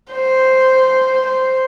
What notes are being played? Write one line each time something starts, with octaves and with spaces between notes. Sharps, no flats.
C5
C5